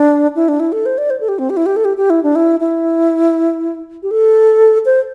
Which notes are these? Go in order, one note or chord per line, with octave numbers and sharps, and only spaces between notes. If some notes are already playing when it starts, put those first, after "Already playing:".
Already playing: D4
E4
D4
E4
A4
C5
D5
C5
A4
G4
C4
G4
E4
G4
A4
G4
G4
E4
D4
E4
E4
G4
A4
C5